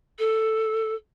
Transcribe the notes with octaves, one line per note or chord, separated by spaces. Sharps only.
A4